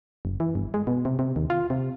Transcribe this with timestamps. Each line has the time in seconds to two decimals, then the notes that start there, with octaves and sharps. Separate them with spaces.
0.25 F#1
0.40 E3
0.55 G1
0.74 G#3
0.87 B2
1.05 C3
1.19 C3
1.36 D#2
1.50 F4
1.70 C3